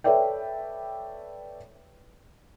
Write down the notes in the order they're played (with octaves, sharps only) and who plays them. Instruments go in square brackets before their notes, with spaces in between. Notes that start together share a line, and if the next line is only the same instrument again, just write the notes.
[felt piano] A4 B4 C#5 D5 E5 G5